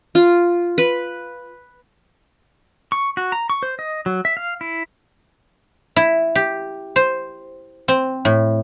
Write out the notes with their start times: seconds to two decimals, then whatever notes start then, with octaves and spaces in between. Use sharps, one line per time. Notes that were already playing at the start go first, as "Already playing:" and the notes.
0.15 F4
0.78 B4
2.92 C#6
3.17 F#4
3.32 A#5
3.50 C#6
3.63 C5
3.79 D#5
4.06 F#3
4.25 E5
4.37 F5
4.61 E4
5.96 E4
6.35 G4
6.96 C5
7.88 C4
8.25 A2